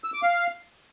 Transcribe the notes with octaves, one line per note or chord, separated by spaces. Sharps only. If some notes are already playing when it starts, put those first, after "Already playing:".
E6
D6
F5